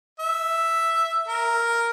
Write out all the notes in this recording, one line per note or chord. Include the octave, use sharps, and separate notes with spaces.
E5
A#4